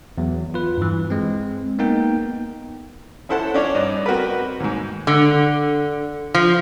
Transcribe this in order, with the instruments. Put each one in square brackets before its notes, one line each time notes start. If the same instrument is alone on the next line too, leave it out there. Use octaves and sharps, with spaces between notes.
[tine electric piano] E2 F#3
F4 B4
G2 E3
G#3 C4
A#3 B3 D#4 A#4 G5
[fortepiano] C#4 E4 A4 C5 F#5 A5
C#4 D4 C#5 D5
G2 D#4 D5
C4 F#4 A#4 B4
D#2 G#2
[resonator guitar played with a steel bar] D3
F3